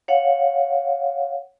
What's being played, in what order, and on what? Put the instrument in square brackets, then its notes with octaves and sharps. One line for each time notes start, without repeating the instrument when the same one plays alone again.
[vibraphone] C#5 F5 F#5